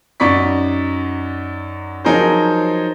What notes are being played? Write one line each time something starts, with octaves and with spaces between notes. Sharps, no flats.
F#2 D#4 D5 C#6 B6
F3 F#3 D#4 G#4 A#4 C5